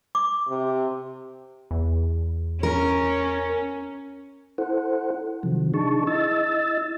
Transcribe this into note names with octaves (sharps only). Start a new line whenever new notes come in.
D6
C3
E2
C#4 A#4
E4 A4 C5 F#5
C3 D#3 F3 F#3
D4 D#4 G#4 A5 C#6
E4 D#5 E6 A6